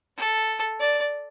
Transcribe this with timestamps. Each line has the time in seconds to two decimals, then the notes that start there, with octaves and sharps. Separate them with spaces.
0.17 A4
0.80 D5